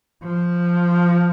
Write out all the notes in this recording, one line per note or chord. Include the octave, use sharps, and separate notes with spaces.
F3